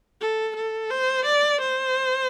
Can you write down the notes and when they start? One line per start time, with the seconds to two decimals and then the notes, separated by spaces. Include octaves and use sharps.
0.21 A4
0.56 A4
0.90 C5
1.25 D5
1.61 C5